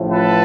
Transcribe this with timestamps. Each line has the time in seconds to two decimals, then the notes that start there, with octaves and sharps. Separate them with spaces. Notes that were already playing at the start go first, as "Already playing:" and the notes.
Already playing: A1 A2 F3
0.09 A4 B4